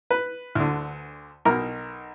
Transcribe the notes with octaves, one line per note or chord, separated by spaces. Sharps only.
B4
D2 D3
B1 B2 A#4